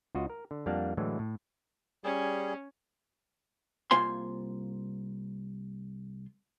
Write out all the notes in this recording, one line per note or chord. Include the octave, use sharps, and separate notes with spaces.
C#2 F4 F#4 D#5
A#4
D3
F2 G3 A#3 D4 F5 F#5
A2 D3 E3 F#3 G#3
A2
G3 C#4 G#4
C2 A#3 F4 C5 G#5 C6